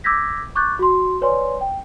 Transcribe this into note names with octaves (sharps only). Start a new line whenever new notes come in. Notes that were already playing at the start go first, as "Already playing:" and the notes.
D6 E6 G6 G#6 A#6 B6
C#6 D6 F#6 G6 A6
F#4 C6
B4 C#5 D5 G#5 C6
G5